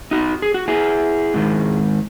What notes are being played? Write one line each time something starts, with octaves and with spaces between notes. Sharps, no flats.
D#4 F#4
G#4
F#4
E4 G#4
G#2 D#3